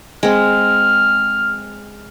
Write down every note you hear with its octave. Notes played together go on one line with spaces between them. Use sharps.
G#3 C4 F6